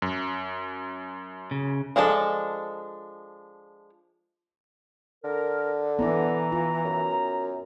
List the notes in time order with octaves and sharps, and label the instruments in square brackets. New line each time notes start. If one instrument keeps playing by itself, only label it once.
[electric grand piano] F#2
[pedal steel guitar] C#3
[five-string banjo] F3 G#3 D4 A4
[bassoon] D3 [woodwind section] A#4
[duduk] E3 [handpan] B3 E4 D5 [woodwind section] A#5
[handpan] F4
[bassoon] F#2